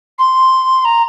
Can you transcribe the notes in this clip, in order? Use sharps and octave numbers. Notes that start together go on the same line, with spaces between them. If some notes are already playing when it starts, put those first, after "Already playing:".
C6
A#5